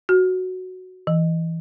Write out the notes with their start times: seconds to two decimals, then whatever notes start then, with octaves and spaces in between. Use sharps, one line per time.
0.09 F#4
1.07 E3